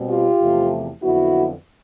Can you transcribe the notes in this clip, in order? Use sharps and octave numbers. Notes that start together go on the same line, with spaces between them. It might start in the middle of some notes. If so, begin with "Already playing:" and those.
Already playing: B2 G3 C4
F4 G4
E2 C3 F3 A3
F2 D3 F#3 B3 E4 F#4